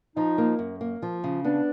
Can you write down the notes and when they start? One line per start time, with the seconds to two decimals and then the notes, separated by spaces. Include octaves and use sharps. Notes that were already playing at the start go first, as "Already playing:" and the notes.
0.16 F3 D#4
0.38 A#3
0.59 F#2
0.81 A#3
1.02 F3
1.24 C#3
1.44 B3 D4